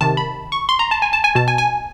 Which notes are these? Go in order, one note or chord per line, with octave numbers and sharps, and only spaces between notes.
C3 D#3 A5
B5
C#6
C6
A#5
A5
G#5
A5
G#5
B2 A5
G#5
G#5